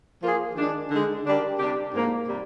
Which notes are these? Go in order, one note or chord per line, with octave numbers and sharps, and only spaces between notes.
F3 A#3 F4 G#4
D#3 G#3 D4
D3 G#3 D#4
D3 G3 D4 G4 A#4
C3 G3 D4 G4
G#2 F3 A#3
C3 G3